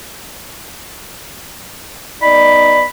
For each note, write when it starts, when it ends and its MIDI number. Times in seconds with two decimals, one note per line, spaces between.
2.22 2.83 59
2.22 2.83 63
2.22 2.83 74
2.22 2.86 83